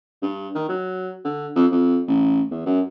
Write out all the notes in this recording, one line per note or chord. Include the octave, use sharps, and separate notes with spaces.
G2
D#3
F#3
D3
F2
F2
A1
E2
F#2